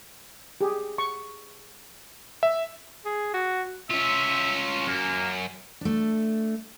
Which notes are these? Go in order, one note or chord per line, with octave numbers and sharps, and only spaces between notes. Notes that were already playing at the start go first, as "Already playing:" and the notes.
G4 G#4
C#6
E5
G#4
F#4
C#4 F4 E5
F#2 A#3
A3 D4